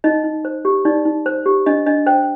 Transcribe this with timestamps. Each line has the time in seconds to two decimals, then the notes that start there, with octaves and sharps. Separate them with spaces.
0.04 D#4 D#5
0.24 D#4
0.45 C5
0.65 G4
0.85 D#4 D5
1.05 D#4
1.26 C5
1.46 G4
1.66 D4 D#5
1.86 D4 D#5
2.06 C5 G5